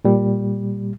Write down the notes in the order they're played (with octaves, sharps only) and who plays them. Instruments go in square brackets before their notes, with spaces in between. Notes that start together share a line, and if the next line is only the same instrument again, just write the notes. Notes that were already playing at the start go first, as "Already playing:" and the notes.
[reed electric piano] A#2 G3